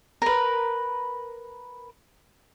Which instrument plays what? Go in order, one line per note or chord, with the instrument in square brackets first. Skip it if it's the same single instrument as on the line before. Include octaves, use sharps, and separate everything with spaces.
[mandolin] A#4 B4